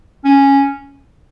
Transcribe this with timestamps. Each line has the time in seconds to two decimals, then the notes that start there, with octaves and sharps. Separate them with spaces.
0.25 C#4